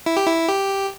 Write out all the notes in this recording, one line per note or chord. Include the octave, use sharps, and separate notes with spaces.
E4
G4
E4
G4